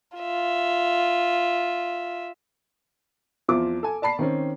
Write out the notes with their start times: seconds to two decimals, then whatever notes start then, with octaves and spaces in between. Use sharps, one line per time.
0.18 F4 E5
3.48 E2 F3 C4 F4 E5 D6
3.83 A4 G#5
4.02 D5 A5 B5 C7
4.19 D#3 C4 C#4